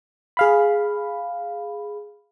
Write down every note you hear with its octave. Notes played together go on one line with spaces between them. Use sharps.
G#4 F5 B5